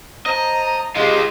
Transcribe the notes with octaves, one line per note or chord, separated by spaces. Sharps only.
C5 D#5 A5 A#5
G#3 F4 G4 D#5